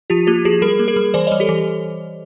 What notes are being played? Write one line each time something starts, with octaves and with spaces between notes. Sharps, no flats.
F3 F4 G4
A#3 F4 G4
F3 F#4 G#4
G3 G#4 A#4
A#3
G#4 A#4
G3
E3 C5 D5
G3 C#5 D#5
G4 A4
E3